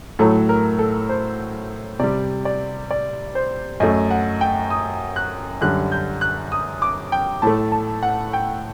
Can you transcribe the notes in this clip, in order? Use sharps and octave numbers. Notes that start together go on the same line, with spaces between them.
A2 F#3 A3 A4
A#4
A4
C5
C3 G3 D5
D5
D5
C5
F#2 F#3 A3 D#5
F#5
G5
D#6
F#6
F#2 D3 G3 F#6
G6
F#6
D#6
D6
G5
A2 A3 A5
A5
F#5
G5